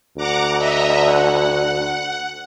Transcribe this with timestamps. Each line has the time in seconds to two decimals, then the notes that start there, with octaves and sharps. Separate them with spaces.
0.17 D2 F#5 A#5 D6
0.58 D#5 E5 A#5
1.05 F#5